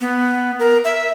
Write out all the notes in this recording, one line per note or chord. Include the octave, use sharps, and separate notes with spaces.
B3
A#4
E5